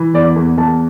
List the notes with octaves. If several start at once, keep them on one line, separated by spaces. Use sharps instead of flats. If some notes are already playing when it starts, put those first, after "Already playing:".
Already playing: E3
E2 D5
E2
E2 A5